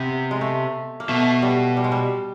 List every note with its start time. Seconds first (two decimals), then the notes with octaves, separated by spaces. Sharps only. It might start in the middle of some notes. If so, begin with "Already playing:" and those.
Already playing: C3 B3
0.31 G#3
0.41 A3
1.00 A#3
1.09 B2 A3
1.42 G3
1.77 G3
1.84 G#3
1.92 G3